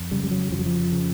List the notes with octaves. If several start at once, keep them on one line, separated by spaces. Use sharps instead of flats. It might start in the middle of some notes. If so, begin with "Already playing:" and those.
Already playing: F2
C#3 G3
G3
F#3
F2 F3
F#3
F3
C#3